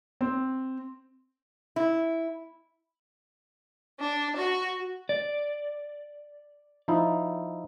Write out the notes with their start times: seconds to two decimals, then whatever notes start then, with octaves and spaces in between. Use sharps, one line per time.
0.21 C4
1.76 E4
3.98 D4
4.35 F#4
5.09 D5
6.88 F3 D#4 E4